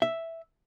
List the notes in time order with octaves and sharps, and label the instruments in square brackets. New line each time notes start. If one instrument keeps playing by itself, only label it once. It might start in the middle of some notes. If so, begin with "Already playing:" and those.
[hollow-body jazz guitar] E5